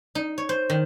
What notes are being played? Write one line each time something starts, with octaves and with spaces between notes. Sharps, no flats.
D#4
C#5
C5
D#3